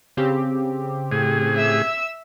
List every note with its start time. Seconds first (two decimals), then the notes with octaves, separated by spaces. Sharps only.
0.17 C#3 C4 G4
1.12 A2 G#4
1.55 E5 E6